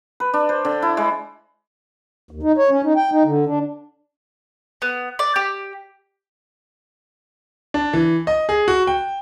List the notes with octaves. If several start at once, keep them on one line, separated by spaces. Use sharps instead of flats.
B4
D4
C5
D3
E4
G#3
D#2
D#4
C#5
C#4
D#4
G5
D#4
D3
D4
B3
D5
G4
D4
E3
D#5
G#4
F#4
G5